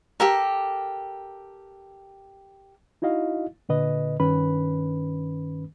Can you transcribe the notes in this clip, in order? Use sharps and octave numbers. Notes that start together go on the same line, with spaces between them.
G4 A4 A#4
D#4 E4 F#4 D#5 F5
A#2 D3 B4 D#5
G2 D#3 C#4 B4 B5